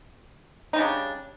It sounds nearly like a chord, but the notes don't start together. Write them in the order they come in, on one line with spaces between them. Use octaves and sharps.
D#4 G3 C#3 D4